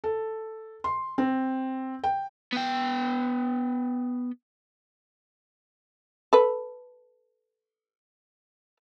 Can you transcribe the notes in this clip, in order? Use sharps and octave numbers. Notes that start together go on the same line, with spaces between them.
A4
C6
C4
G5
B3 G5
A4 B4